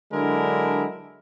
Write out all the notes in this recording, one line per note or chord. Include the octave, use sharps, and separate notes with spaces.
D3 F#3 G#3 D4 E4 A#4